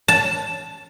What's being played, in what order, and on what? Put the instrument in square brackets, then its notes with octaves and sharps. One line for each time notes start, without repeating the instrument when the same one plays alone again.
[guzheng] A5